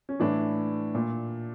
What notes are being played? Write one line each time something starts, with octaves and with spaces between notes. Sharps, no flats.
C#4
A2 E3 D4
A#2